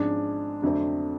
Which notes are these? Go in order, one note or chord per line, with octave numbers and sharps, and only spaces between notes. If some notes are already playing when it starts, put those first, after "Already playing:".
Already playing: G#1 G#2 F3 G#3 C#4 D4
F2 D3 F#3 A3 C4 D4